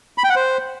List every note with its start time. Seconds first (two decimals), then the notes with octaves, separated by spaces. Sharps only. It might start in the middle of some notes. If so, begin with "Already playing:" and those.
0.18 B5
0.24 G5
0.30 F#5
0.36 C5